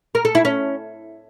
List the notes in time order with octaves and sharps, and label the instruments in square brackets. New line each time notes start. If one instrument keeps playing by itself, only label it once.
[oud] A#4
A4
E4
C#4